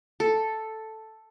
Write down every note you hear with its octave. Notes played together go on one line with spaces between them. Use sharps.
A4